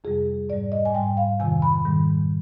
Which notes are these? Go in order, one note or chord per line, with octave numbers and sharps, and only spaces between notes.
F2 C3 G3 G#4
G#2 G3 D5
D#5
G#5
G#2 G3 G5
F5
F2 C3 D#3 G#5
B5
G#2 D#3 G3